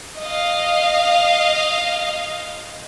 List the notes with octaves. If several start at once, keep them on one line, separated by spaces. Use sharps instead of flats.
D#5 F5